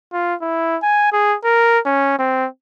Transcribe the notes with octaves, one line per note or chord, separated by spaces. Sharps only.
F4
E4
G#5
G#4
A#4
C#4
C4